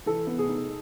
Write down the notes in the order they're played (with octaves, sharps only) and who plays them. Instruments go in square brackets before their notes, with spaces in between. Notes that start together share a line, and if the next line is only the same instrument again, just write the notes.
[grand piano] E3 [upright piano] A4
[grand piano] B3
[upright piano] G#4
[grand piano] D#4